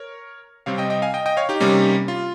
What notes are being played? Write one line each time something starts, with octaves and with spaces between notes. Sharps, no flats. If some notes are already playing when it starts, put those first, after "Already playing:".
Already playing: A#4 C#5
C3 G3 C4 C#5 F5
D#5 G5
D#5 G5
F5 G#5
D#5 G5
D#5 G5
C#5 F5
D#4 G4
C3 G3 A#3 C#4
F4